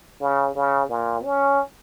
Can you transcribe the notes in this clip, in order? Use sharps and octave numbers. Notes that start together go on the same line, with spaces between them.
C#3
C#3
A#2
C#4